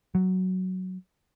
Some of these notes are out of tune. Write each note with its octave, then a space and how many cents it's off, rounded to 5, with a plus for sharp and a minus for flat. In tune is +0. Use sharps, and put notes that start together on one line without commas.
F#3 +5